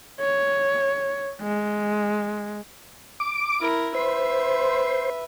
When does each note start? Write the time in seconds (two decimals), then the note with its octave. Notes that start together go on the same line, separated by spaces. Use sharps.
0.21 C#5
1.41 G#3
3.20 D6
3.61 E4 A#4
3.95 B4 C5 E5